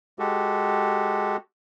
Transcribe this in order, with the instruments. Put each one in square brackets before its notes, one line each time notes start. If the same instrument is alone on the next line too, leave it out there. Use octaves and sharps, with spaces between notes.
[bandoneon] G#3 F#4 G4 A4